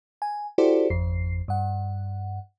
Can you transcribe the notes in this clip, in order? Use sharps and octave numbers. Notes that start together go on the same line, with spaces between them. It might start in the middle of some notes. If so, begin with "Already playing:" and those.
G#5
E4 F#4 G4 A4 C5 D5
G#1 F2 C7
G2 F#5